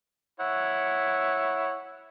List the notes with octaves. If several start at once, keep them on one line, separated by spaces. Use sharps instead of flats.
E4 C#5 F#5